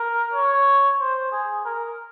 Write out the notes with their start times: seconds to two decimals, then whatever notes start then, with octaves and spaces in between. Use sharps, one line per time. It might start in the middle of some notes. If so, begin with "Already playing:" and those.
Already playing: A#4
0.34 C#5
1.00 C5
1.32 G#4
1.65 A#4